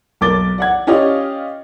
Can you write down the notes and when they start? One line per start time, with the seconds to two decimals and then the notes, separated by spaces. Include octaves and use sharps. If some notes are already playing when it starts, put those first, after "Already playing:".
0.21 B1 A#3 D6 A6 G7
0.58 D5 F#5 G#6
0.87 C#4 F4 G4 D5 D#5 F5